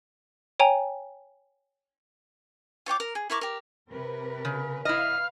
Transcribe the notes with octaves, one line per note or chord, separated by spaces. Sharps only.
C#5 G5 G#5 A#5
F4 C#5 G5 D6
A#4
G#4
E4 A#4 C#6 D6
G4 A#4
C3 A#4 B4
C#3
E4 B4 D#5 F5 F6